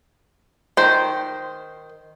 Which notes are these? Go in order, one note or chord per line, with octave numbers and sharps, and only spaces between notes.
D#3 C5